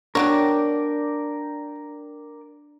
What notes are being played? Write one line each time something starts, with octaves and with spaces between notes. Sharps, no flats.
F#3 B3 D4 A#4 C#5 D5 G5